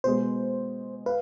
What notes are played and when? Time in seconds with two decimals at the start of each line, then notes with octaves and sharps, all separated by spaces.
0.04 B2 G#3 B3 C5
1.06 B4 F5